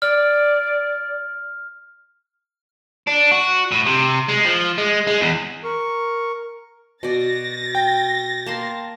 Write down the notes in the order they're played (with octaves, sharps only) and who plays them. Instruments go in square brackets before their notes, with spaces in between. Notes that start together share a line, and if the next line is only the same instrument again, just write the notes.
[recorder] D5 [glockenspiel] F6
[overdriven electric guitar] D4
F#4
A2
C3
G#3
F3
G#3
G#3
E2
[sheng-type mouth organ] A#4 C#6
[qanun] B2 D5 [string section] A6 A#6
[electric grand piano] G5
[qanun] A#3 A5 C6